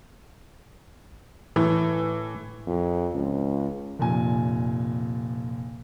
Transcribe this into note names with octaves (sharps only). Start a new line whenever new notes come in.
A2 E3
F2
C#2
F1 A#2 G#5